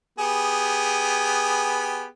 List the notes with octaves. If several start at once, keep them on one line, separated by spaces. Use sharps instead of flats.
B3 G4 G#4